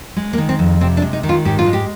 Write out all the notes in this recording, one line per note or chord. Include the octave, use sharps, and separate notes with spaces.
G#3
A#3
D#3
C4
F2
C3 C4
D4
G#3
D#4
D#3
F4
G#2 G4
F4
G#3
G4